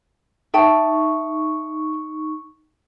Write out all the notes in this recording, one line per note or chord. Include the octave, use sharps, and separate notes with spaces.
D#4 E5 G5 A5 C#6